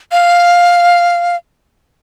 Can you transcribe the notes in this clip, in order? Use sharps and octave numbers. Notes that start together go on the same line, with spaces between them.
F5